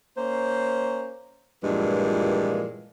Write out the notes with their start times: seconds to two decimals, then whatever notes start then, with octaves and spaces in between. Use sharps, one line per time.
0.18 A#3 C#4 C5
1.64 G2 A#2 E3 F3 G#3